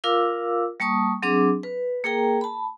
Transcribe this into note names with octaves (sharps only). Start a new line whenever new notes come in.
F4 A#4 F5 D6 E6
G3 A#3 A5 C#6 D#6
F#3 C4 D4 G#4 D6
B4
A#3 G#4 A#4 G5 A#5
A5 B5